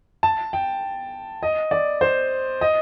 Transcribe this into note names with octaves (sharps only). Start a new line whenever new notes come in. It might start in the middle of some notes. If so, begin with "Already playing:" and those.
A5
G5
D#5
D5
C5
D#5